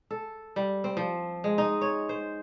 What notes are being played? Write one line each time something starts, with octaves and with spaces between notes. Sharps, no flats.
A4
G3
C4
F3
G#3
D#4
C#5
C5